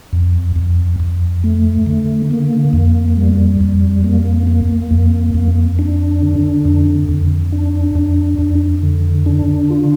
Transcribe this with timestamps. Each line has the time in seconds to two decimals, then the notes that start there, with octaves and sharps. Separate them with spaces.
0.13 F2
0.56 F2
1.00 F2
1.44 A3
1.86 D3
2.31 A#3
2.73 F2
3.17 G3
3.61 F2
4.04 A#3
4.47 A#3
4.91 F2
5.34 F2
5.79 D4
6.22 D3
6.65 F2
7.09 F2
7.52 D4
7.95 F2
8.39 F2
8.83 D3
9.26 D4
9.70 F4